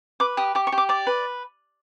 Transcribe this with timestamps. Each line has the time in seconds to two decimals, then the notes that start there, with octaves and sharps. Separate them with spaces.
0.20 B4 D6
0.37 G4 D#6
0.55 G4 D6
0.67 C#6
0.72 G4
0.78 D6
0.89 D5 D6
1.07 B4